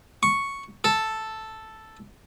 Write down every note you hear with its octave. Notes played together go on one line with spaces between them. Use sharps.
C#6
A4